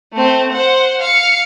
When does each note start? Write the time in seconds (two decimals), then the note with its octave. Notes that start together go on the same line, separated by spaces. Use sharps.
0.13 A3 C4
0.52 C5 F#5
1.01 F5 C#7